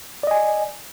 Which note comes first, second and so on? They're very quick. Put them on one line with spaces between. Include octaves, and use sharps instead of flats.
D5 D#5 G#5